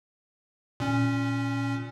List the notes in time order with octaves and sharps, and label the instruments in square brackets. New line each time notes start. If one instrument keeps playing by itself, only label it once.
[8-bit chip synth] A#2 C#4